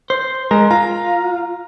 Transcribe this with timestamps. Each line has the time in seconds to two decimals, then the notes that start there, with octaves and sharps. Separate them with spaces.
0.10 C5
0.51 G#3 A#4
0.71 F4 A#5